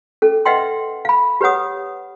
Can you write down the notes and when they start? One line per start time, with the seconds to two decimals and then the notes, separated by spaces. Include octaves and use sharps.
0.22 C#4 A4
0.45 B4 D#5 E5 F#5 G5 C6
1.05 F5 B5
1.41 G4 B4 C#5 F#5 D#6